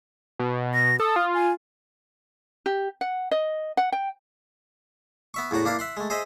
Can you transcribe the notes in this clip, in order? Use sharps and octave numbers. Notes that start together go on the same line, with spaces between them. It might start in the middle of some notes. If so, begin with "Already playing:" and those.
B2
A#6
A4 D#6
F4
G#5
G4
F#5
D#5
F#5
G5
B3 E5 C#6
E2 A2 F#4 A#5
A#3 D4 E4 F5
E5 F#5 C6
G#3 A3
G#4 C5 D#5 E5